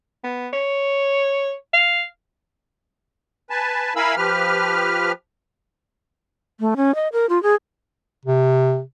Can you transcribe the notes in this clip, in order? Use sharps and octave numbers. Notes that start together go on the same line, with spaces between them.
B3
C#5
F5
B4 G#5 A5
E4 A#4 F5 G#5 B5 E6
F3 G4 B4 F6
A3
C#4
D#5
A#4
F4
G#4
C3